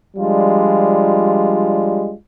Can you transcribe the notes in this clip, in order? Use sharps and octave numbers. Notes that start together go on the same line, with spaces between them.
F3 G3 G#3 D4 F4